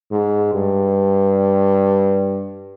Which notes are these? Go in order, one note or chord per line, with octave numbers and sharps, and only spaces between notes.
G#2
G2